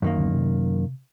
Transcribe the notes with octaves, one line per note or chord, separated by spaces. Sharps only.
F#2 D#3 F#3 A#3
D1 D3 B3
C3